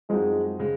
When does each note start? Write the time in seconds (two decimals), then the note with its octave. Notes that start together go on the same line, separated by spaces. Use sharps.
0.09 F#2 F3 G#3 C4 D#4 F#4
0.59 C#3 G#3